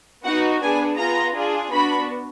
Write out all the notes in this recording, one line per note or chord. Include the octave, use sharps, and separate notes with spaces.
B3 D#4 F#4 F#5
B3 D4 G#4 G#5
B3 F4 G#4 A#5
D4 F4 G#4
B3 D4 F#4 B5